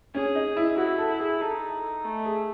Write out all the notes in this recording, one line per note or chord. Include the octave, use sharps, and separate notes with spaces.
C#4 G#4
D#4
E4
E4 F#4
A4
E4
G#4
D#4 A4
A3
G#4